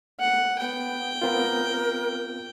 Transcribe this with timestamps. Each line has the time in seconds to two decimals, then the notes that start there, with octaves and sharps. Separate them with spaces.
0.20 F#5
0.59 B3 G5
1.22 B3 C4 F4 A#4